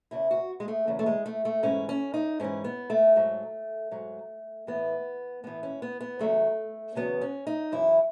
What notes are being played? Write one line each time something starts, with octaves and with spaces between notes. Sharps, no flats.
E2 C#3 E3 E4
F#4
G#3
A3
E2 C#3 E3
A3
G#3
A3
A3
G#2 E3 C#4
C#4
D#4
G#2 E3 C#4
B3
A3
G#2 F#3
G#2 F#3
A2 E3 B3
A2 E3 B3
C#4
B3
B3
E2 C#3 F#3 A3
E2 C#3 F#3 B3
C#4
D#4
F#2 E3 E4